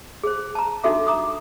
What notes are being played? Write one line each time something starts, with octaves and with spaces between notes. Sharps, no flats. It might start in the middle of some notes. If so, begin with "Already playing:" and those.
G#4 C5
A5 A#5
D4 D#4 F#4 A4 E5 D6
A#5 D6 D#6